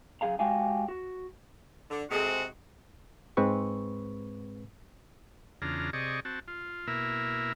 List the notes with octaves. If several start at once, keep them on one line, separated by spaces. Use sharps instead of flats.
F#2 G3 G#4 F5 A#5
G#3 F#4 G4 F5 G#5
F#4
D3
C3 G#3 C4 F#4 G#4 A4 G#5
G#2 G#3 C4 B4 C#6
E2 C#3 D4 F4 A#5
C3 G#4 D5 D#5 C#6
C4 F#4 A5
F4
B2 A#3 E4 A#4 E5